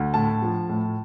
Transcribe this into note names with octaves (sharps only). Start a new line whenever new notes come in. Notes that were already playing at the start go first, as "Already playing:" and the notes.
Already playing: D2
A2 A5
F3
A2